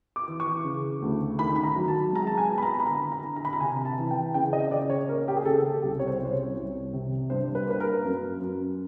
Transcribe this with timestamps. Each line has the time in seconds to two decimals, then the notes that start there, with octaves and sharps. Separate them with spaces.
0.16 D6
0.28 E3
0.40 C#6
0.64 C#3
1.02 D2
1.39 D#3 B5
1.56 B5
1.63 A#5
1.76 F#3
1.88 A5
2.13 G#3 A#5
2.27 A5
2.38 G#5
2.49 B3
2.58 B5
2.63 A#5
2.80 B5
2.87 D3 A#5
3.12 A#5
3.24 D3
3.36 A#5
3.45 B5
3.53 A#5
3.60 C3 G#5
3.85 A5
3.98 E3
4.11 G5
4.34 C#3 G5
4.53 D#5
4.71 C#3 D5
4.90 C#5
5.08 A#3 A#4
5.28 G4
5.37 G#4
5.45 C#3 A4
5.82 C2 G4
6.00 C#5
6.07 C5
6.20 C2
6.25 C5
6.32 C#5
6.57 C2
6.93 C3
7.30 G2 C5
7.55 B4
7.67 A#3 B4
7.80 A#4
8.05 F#2
8.41 F#2